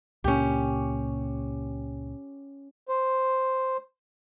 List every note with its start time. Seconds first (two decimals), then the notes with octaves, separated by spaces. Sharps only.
0.24 C#2 A#2 A#3 C#4 G4
2.89 C5